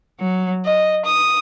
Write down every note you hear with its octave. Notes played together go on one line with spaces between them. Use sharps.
F#3
D#5
D#6